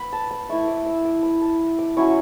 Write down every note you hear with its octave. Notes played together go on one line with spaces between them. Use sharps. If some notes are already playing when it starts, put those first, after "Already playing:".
Already playing: B3 B5
A5
B5
A3 E4 C#6
D6
E6
D6
B5
A5
D6
F#3 C#4 E4 C#6